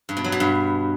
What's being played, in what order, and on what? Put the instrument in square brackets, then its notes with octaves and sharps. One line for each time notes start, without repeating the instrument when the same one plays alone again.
[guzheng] G2
B2
F#3
B2
G2